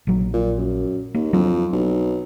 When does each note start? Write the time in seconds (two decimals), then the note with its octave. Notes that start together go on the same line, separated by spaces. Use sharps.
0.07 A#1 F#3
0.33 A#2
0.58 F#2
1.14 D#2 A#3
1.33 F2 F#3 D4
1.73 B1